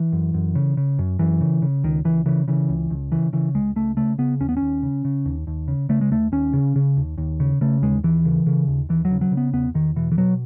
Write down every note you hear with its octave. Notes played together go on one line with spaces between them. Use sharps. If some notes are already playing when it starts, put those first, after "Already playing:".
Already playing: E3
F#2
F#2
C#3
C#3
F#2
F#2 E3
C#3
C#3
C#2 D#3
C#2 E3
C#3 E3
C#3 E3
C#2
C#2
C#3 E3
C#3 E3
C#2 G#3
C#2 A3
C#3 A3
C#3 B3
D#2 C#4
B3
D#2 C#4
C#3
C#3
D#2
D#2
C#3
C#3 A3
G#3
D#2 A3
D#2 C#4
C#3
C#3
D#2
D#2
C#3
C#3 A3
D#2 G#3
D#2 E3
C#3
C#3
D#2
D#2 E3
F#3
C#3
F#3
C#3
B3
E2 B3
E2 D#3
B2 E3
E3
B2 F#3